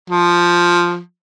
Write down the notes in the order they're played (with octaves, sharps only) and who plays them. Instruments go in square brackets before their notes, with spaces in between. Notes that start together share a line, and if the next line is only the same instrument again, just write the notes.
[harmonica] F3